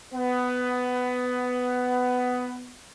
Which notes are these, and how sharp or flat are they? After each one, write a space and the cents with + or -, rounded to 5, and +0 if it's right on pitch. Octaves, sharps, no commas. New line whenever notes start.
B3 +15